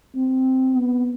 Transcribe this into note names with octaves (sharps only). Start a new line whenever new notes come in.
C4
B3